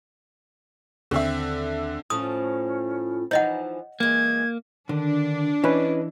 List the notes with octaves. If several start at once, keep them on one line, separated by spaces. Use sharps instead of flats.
D#2 D3 C4 E5
A2 F3 C#4 F4 D#6
E3 F3 D#4 C#5 D#5 F#5
E3 G#3 A#3 G#6
D3 D#3 D4
E3 C#4 E4 B4 D#5